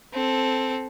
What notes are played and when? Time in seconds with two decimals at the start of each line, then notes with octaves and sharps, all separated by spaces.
0.13 C4 A4